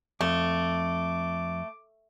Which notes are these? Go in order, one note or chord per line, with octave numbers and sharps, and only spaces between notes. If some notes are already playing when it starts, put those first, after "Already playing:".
F2 A3 D6